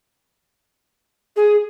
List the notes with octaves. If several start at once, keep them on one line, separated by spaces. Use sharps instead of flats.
G#4